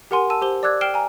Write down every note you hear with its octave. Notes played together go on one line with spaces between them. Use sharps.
G4 A#4 F#5 G#5 C6 D#7
A5 E6 D#7
G4 C5 G7
D5 D6 E6 F#6 G#6
G5 F6 C7 D7 E7 G7
G#5 A#5